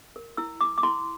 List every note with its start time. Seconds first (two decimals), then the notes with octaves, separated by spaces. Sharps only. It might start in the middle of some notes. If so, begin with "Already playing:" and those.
0.16 A#4
0.37 E4 E6
0.61 E4 D6
0.78 D6
0.83 E4 C6